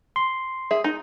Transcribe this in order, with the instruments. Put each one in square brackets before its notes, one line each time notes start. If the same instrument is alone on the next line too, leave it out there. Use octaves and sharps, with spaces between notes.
[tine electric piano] C6
[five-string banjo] G#4 E5
D#4